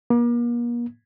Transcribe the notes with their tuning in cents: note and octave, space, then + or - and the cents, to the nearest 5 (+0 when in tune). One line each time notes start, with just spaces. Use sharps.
A#3 +40